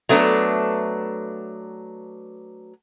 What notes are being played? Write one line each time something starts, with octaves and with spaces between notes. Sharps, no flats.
F#3 A3 B3 D4